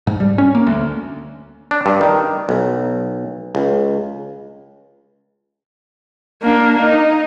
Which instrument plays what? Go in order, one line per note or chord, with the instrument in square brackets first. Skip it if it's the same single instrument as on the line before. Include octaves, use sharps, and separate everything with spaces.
[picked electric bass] G#2
G3
C#4
A#3
D2
[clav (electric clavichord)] D4
G2
D#3
B1
C#2
[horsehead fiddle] A#3 D4
D#4